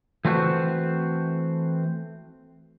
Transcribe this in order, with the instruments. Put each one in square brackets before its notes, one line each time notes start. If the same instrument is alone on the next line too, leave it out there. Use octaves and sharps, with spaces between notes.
[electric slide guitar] E3 A3 C4 F#4 C5